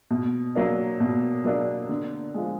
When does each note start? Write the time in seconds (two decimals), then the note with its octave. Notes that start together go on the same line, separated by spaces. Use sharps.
0.11 B2
0.55 F#3 A#3 D4
1.00 B2
1.44 F#3 A#3 D4
1.89 D3
2.34 F3 G#3